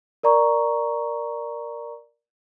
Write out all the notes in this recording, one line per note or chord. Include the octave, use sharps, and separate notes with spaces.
A#4 D5 A#5 C#6